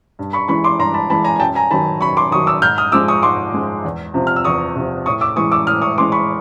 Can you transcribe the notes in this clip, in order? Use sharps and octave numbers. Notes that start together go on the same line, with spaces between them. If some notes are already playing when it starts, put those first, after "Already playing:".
G2
B5 C#6
E3 G#3 B5 C#6
C6 D6
G2 A#5 C6
A5 B5
E3 G#3 A5 B5
G#5 A#5
G#5
F#2 G5 A5
G#5 A#5
D#3 F#3 A5 B5
F#2 B5 C#6
C6 D6
D#3 F#3 C#6 D#6
D6 E6
G#2 F6 G6
D#6 F6
F3 G#3 D6 E6
C#6 D#6
G#2 C6 D6
F3 G#3
E2
C3 F3
F6
E6
E2 C#6 D#6
C3 F3
A2 C#6 D#6
D6 E6
E3 G#3 C#6 D#6
D6 E6
A2 D#6 F6
C#6 D#6
E3 G#3 C6 D6
B5 C#6